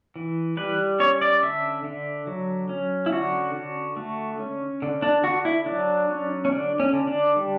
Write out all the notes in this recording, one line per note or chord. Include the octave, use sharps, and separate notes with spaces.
E3
G3 B4
C#4 C#5
D5
D3 E5
D3
F#3
C#4
E4
D3 F#4
D3
A3
C#4
D3
D4
D3 F#4
E4
F#3 D4
C#4
C#4
D3 D4
C#4
D3
D4
G3